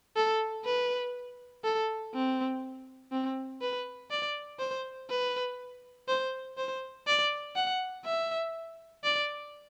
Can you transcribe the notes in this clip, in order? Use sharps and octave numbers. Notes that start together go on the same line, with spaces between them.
A4
B4
A4
C4
C4
B4
D5
C5
B4
C5
C5
D5
F#5
E5
D5